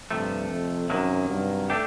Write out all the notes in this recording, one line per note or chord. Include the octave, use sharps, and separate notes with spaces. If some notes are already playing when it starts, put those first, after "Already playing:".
G2 C3 F3 A3
F2
F#2 C3 D#3 F#3 A#3
G2
A3 D4 G4